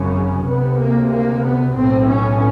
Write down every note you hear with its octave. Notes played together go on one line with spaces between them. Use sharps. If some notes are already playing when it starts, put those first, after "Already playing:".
Already playing: G#1 F#2 C#3 C#4
D2 C3 B3
A#3
A#3
B3
B1 A2 C4
C#4